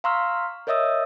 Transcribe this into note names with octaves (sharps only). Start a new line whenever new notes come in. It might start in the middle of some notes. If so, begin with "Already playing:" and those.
F5 A#5 C6 C#6 E6 F6
A#4 C#5 D#5 E5 D#6 E6